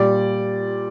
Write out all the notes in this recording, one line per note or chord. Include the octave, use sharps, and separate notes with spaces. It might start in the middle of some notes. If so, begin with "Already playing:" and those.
Already playing: A#2 G3 D5